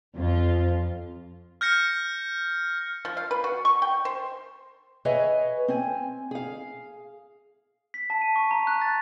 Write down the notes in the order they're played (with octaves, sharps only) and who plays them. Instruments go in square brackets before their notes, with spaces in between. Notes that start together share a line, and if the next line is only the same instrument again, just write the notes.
[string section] F2 F4
[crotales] F6 G6 A#6 C#7
[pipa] F3
F5
B4
F#4
C#6
G5
C5
[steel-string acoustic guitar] G#4 B4 C#5 D#5 E5 G#5
C4 G#5
G#4 F5
[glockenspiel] B6
A5
D#7
C#6
A#5
F#6
A6